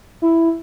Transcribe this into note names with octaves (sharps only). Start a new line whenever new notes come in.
E4